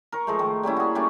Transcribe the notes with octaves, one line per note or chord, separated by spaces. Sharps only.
A#4 C#6
F3 G#3 A3
D#3
G3 A#3 C#4 E4
F#4 G#4
G3 A3 C#4 D4